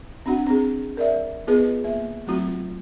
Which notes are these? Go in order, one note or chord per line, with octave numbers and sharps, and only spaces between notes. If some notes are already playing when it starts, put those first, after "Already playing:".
C4 D4 F#4 F#5
C4 G#4
A#4 D5 E5
B3 F4 G#4 B4 D#5
A#3 E5
F#3 A3 C4 F4 F#4